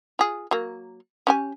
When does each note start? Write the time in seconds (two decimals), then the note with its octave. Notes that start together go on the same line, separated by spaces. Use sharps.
0.19 F4 G#4
0.51 F#3 A#3
1.27 C#4 G4 G#5